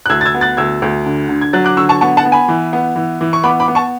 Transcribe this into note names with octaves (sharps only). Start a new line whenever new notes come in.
F#6
D2 E6 G#6
A6
E6 G#6
B3
F#6 A6
D2 E6 G#6
D2
D3
D3
G#6
F#3 F#6 A6
D6 F#6
D3 C#6 E6
A5 C#6
B3 A5 C#6
F#5 A5
B3
G#5 B5
E3
B3
E3
E3
C#6
B3 B5 D6
B5 D6
B3
A5 C#6